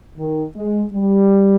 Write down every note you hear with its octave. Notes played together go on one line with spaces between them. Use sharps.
D#3
G#3
G3